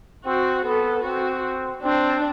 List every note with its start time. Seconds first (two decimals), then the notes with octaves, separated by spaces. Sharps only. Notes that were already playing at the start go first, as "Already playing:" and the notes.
0.25 C4 F#4
0.65 B3 A4
1.04 C4 F#4
1.82 C4 D4